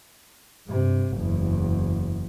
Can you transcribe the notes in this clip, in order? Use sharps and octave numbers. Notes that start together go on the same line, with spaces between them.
G2 C3
F#1 E2